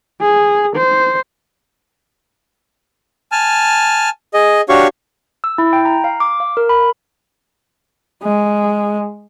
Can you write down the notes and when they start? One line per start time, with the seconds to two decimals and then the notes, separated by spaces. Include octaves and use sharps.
0.21 G#4
0.76 C5
3.32 G#5 A5 F6
4.34 G#4 D#5
4.69 D4 F#4 G4 C#5 F5 C#6
5.44 E6
5.58 E4
5.73 G5
5.85 A#5
6.04 F5
6.20 D6
6.40 F5
6.57 A#4
6.69 B5
8.22 G#3